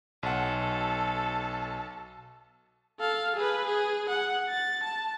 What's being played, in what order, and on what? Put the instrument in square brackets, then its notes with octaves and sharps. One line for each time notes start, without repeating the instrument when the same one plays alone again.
[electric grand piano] B1 F#5 [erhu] A4
[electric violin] A4 F5
G#4 B4
G#4
F#5
A6
A5